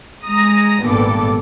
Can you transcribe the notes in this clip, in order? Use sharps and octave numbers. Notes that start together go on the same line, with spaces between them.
G#3 A#5 D#6 A#6
G#1 G2 A#2 B3 A4 D6